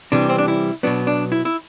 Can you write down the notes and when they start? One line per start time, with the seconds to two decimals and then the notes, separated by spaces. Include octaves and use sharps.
0.12 C3 E3 G3 D4
0.29 C4
0.38 D4
0.48 E4
0.83 B2 F#3 B3 D4
1.07 D4
1.32 E4
1.45 E4